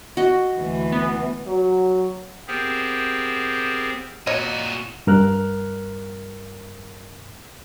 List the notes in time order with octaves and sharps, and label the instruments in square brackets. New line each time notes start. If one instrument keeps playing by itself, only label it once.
[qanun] F#4 D#5
[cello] D2 E3
[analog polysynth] B3
[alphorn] F#3
[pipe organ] B3 C4 G4 G#4 A#4 C5
[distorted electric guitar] A#2 F#4 [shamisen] C#5 D#5
[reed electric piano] G2 A#4 F6 F#6